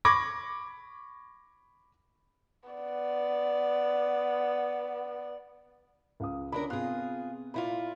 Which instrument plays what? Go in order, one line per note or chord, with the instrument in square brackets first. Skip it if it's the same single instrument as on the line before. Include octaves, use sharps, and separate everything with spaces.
[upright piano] B5 C#6 D6 G#6 A#6
[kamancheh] B3 D5
[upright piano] C#2 F5 D#6
[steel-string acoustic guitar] D3 D4 A#4 [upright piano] C#4 B5
[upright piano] C3 B3 F#6 [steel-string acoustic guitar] F4 G#4
[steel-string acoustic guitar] A#2 E4 F4 [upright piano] B5